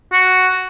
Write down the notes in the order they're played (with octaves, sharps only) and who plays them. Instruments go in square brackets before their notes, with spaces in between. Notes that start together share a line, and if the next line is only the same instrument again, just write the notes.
[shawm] F#4